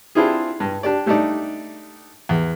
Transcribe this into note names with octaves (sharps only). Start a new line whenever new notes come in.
C4 D4 E4 F4 G4 G#4
G2
D4 G4 D5
G3 A3 D4 D#4 D5
E2